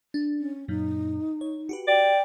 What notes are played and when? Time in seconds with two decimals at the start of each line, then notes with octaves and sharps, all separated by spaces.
0.14 D4
0.39 C#4
0.68 F#2 A#2 D#4
1.41 C#5
1.69 F#4 G4 B4
1.88 D5 G5